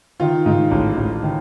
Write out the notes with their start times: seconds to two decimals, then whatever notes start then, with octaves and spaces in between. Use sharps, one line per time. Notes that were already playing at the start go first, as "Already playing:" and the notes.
0.20 D#3 F4
0.46 G#2
0.71 A1
0.97 A1
1.23 D#3